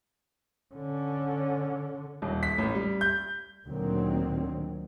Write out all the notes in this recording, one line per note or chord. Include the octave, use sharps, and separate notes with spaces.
D3 C#4
D#1
B6
A1
G3
G6
D2 A#2 D3 D#3 F#3 C4